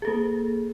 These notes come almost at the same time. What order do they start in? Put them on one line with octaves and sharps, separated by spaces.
G#4 A4 A#3